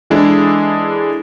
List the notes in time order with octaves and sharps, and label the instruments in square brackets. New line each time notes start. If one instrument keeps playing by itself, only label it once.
[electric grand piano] E3 G#3 D4 E4 G#4 A4